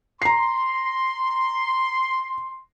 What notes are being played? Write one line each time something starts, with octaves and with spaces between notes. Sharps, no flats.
A#5 C6 C7